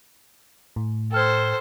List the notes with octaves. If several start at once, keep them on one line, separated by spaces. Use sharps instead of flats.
A2
A4 C5 G5 F6 G#6